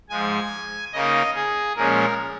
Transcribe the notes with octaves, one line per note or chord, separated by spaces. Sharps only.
G#2 F3 G#3 G#5
C#3 A#3 D#4 D#5
G#4
A#2 F3 G#3 C#4 A#4